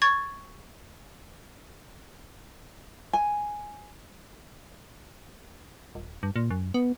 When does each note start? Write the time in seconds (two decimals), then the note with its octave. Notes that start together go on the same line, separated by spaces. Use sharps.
0.02 C#6 G#6 A6
3.13 G#5
5.95 D#1
6.23 G2
6.36 A#2
6.51 F#2
6.74 B3